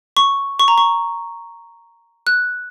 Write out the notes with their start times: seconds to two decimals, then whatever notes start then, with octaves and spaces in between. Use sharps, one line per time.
0.17 C#6
0.59 C#6
0.68 A#5
0.78 C#6
2.27 F#6